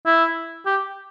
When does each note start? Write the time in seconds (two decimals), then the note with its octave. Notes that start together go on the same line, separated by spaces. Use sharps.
0.06 E4
0.66 G4